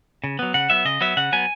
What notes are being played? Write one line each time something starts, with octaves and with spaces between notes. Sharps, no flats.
C#3
F#3 B3
C#3 F#5
F#3 B3 E5
C#3 D#5
F#3 B3 E5
C#3 F#5
F#3 B3 G#5